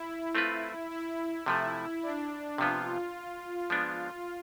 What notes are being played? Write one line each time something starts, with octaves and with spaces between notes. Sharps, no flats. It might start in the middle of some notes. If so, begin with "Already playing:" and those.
Already playing: E4
A3 C4 F4 B4
E4
C3 F3 A3 E4
D4
C3 F3 B3 F4
F3 G#3 B3 D4